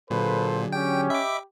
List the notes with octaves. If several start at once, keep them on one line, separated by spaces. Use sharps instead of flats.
A#2 D3 F#3 A#3 G#4 A4 B4 C5
C#4 G4 G5
D#5 E5 B5 D6